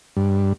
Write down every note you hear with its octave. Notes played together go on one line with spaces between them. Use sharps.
G2